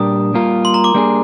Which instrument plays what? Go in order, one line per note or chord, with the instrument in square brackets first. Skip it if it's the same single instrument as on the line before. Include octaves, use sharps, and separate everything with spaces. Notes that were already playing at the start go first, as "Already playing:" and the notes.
Already playing: [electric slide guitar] A#2 G3 D4 G4 A#4 [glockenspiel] D#6
[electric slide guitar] G3 A#3 F4 A#4
[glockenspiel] C6
A#5
D6
[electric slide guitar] G3 A#3 D4 G#4